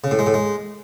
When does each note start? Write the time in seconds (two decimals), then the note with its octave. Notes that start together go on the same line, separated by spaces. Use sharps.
0.04 C#3
0.11 A2
0.19 G#3
0.26 A2
0.34 G#3